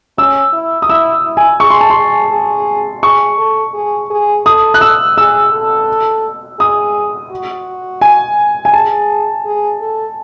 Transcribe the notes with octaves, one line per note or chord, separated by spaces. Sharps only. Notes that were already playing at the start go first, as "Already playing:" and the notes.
C#4 E6
E4
D#6
E4 E6
E4
G#5
G#4 C#6
C6
A5
C6
G#4
G#4
G#4 C#6
A4
G#4
G#4
A4 D#6
F#6
E6
G#4 E6
A4
G#4 D#6
F#4
G#5
G#5
G#4 A5
G#4
A4